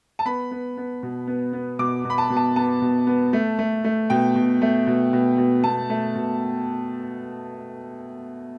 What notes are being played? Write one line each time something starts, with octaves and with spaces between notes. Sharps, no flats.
A5
B3 B5
B3
B3
B2
B3
B3
B2 D6
B2
B5
A5
B2
A5
B3 A5
B2
B3
A3
A3
A3
B2 G5
B2
A3
B2
B2
B2
B2 A5
A3
B2